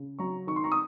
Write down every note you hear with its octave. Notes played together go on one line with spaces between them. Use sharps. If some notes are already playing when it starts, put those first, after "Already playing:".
Already playing: C#3
F#3 A#5 C#6
D#3 C#6
C6
A#5 C#6
D#6